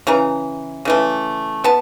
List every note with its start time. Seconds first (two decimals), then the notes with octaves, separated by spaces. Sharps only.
0.07 C#3 E3 A#5
0.85 C#3 E3 A3
1.64 B3 A5